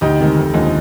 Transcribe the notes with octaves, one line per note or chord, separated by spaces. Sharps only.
D2 D#4 G4
C3 D#3 G#3
F1
D#2 D3 F3 G#3